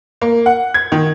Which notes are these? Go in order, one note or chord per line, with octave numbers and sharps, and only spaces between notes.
A#3
F#5
G#6
D#3